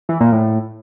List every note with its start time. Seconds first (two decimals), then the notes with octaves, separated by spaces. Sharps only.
0.09 E3
0.20 A#2
0.32 A2